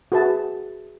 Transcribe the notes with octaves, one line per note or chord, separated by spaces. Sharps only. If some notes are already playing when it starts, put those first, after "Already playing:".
F#4 G#4 B4 E5 A5